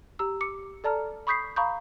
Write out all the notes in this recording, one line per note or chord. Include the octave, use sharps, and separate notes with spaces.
G4 A#5 E6
D6 C#7
A4 D5 A5 A#5 F6
B5 C#6 D#6 G6 B6 C7
F5 A#5 B5 C#6 D#6 G6